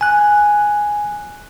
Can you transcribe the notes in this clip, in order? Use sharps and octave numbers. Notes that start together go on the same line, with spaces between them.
G#5 F#6